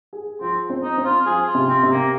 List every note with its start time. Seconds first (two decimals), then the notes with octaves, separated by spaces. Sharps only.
0.13 G#4
0.41 F3 C4
0.70 C4
0.83 D#4
0.98 C4
1.05 F4
1.26 F3 G#4
1.47 F4
1.55 C3
1.69 C4
1.83 C3
1.91 A#3